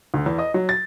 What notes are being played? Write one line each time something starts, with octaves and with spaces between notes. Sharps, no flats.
D2
E2
D#5
F#3
A6